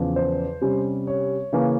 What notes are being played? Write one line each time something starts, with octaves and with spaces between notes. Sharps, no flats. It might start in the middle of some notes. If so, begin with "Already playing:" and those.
Already playing: E2 C#3 F3
C5
C3 G3 C#4
C#5
C#3 E3 A#3 C#4